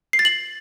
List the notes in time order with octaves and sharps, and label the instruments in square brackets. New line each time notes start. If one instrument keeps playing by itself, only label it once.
[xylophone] C7
A6
F#7